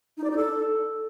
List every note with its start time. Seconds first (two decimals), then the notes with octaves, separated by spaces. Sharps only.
0.17 D#4
0.24 D5
0.30 D#4
0.37 A4